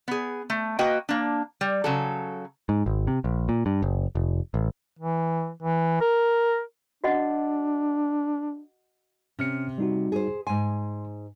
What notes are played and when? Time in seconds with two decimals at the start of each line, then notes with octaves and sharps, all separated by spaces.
0.08 B3 G#4
0.50 A3
0.79 A#3 F#4 B4 D#5 G5
1.09 A#3 D4
1.61 G3
1.84 C#3 F#3 A4
2.69 G#2
2.86 G#1
3.07 C3
3.24 A#1
3.49 A#2
3.66 G2
3.82 F#1
4.15 F1
4.54 A1
4.99 E3
5.63 E3
6.01 A#4
7.04 D4 F#4 D#5 F#5
9.39 C3 C#4 F6 C#7
9.78 G3 D#4 F#4
10.12 G#4 C5
10.47 G#2 G#5 C6